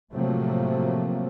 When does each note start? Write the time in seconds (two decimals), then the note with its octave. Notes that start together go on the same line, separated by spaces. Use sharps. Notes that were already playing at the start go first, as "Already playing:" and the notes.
0.14 A2 C3 F3 F#3 A3 A#3